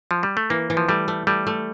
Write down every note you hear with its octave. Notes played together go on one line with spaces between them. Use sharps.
F3
G3
A3
E3 A#3
E3
F3
G3 A3
A3
G3 A3
A3